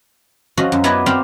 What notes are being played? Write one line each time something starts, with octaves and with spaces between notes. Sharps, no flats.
F3 C#4 F#4 D#5
F#2
B3 E4 B4 D5 D#5 G#5
C4 A#4 D5 F5 G5